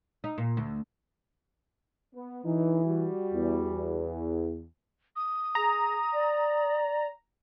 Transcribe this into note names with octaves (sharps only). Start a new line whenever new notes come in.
D#4
A#2
D2
B3
B1 E3 D#4
G3 F#4
E2
D#6
G#4 A#5
D5